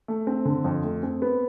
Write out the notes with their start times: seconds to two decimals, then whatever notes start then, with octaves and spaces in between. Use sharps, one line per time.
0.08 A3
0.27 C4
0.45 D3
0.64 F2
0.83 A3
1.03 C4
1.22 B3